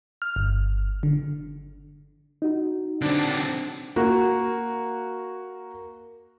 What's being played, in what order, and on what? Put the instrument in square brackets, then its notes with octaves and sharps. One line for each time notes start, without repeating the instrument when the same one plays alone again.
[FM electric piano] F6
G1
D3
[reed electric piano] D#4 F#4
[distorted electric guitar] D3 C4 [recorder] D4
[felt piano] A#3 F#4